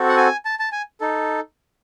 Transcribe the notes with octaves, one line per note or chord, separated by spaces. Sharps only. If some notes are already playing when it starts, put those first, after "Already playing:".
Already playing: C4 F#4 A4
F#5
G#5
A5
A5
G#5
D#4 A4